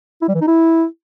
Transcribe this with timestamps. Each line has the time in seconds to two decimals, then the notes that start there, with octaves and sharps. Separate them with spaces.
0.22 E4
0.28 G3
0.35 E3
0.41 D#4
0.48 E4